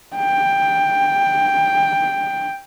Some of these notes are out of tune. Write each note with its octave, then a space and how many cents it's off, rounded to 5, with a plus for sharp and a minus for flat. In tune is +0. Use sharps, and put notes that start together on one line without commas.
G5 +10